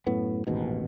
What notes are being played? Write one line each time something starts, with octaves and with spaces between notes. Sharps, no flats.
F#2 A2 B3
A1 D#2 G#2 B2